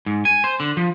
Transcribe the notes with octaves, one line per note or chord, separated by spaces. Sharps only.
G#2
G#5
C5
D3
F3